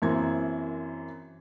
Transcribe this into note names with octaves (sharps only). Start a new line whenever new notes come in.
F#2 E3 A#3 C4 C5 G#6